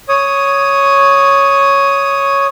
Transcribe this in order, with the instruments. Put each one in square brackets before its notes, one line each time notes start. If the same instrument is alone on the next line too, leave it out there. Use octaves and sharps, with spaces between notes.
[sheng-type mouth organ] C#5 D#6